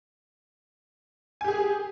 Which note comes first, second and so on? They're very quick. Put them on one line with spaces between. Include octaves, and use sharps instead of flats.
G#5 G4 G#4